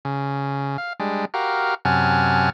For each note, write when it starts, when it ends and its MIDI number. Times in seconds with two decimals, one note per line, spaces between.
0.05 0.77 49
0.78 0.93 77
1.00 1.25 55
1.00 1.25 56
1.00 1.25 62
1.34 1.75 66
1.34 1.75 67
1.34 1.75 70
1.34 1.75 77
1.85 2.50 42
1.85 2.50 48
1.85 2.50 78
1.85 2.50 80
1.85 2.50 81
1.85 2.50 89